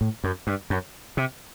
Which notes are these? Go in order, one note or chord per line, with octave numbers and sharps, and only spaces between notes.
A2
F#2
G2
F#2
C3